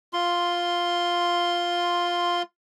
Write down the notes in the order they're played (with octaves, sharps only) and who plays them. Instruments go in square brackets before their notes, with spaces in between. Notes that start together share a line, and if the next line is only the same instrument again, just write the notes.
[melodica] F4 C6